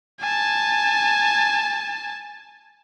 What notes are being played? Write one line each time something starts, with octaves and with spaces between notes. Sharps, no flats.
G#5 A5